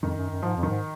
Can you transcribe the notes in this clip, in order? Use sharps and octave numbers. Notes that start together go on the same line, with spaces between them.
F2 D#3
F#2
F#2
G#2 F3
F2
D#3
G#2